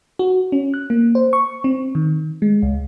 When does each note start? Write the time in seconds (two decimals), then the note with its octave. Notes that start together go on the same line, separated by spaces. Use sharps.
0.19 F#4
0.52 C#4
0.74 F#6
0.90 A#3
1.15 C5
1.33 C#6
1.64 C4
1.95 D#3
2.42 G#3
2.63 C#2